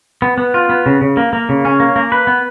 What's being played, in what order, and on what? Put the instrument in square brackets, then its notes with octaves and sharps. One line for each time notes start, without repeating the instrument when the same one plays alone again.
[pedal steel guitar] B3
B3
F4
B3
C#3
C#3
A#3
A#3
C#3
C#4
A#3
A#3
B4
B3